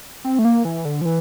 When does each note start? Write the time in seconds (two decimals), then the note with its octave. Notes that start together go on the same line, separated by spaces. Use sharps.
0.24 C4
0.39 A3
0.45 A#3
0.65 E3
0.85 D3
1.01 F3
1.05 E3